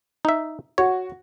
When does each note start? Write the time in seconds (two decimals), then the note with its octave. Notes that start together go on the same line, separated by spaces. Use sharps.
0.25 D#4 E5
0.78 F#4 C#5